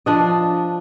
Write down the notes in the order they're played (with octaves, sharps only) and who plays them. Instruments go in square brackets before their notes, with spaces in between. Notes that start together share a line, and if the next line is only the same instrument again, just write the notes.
[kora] F3 D4 D#5